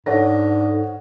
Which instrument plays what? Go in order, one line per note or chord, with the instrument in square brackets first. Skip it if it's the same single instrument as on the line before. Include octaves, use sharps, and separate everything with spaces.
[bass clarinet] G#2 [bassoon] D3 [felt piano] C#5 F#5 A#6